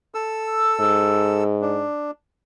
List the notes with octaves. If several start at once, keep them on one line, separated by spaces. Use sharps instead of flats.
A4 E6
G#2
D4